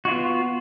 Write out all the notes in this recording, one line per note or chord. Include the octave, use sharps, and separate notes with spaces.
B3 F4 F#4